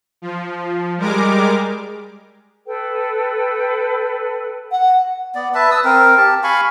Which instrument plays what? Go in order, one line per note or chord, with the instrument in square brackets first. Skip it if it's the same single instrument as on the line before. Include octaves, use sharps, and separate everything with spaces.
[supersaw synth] F3
G3 G#3 A#4 D6
[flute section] A4 B4 G5
[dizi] F#5
[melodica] B3 D5
B4 E5 A5
A5 D#6 E6
C4 A#4
G4 A5
F5 G#5 B5 C#6